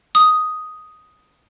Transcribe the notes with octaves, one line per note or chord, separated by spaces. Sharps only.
D#6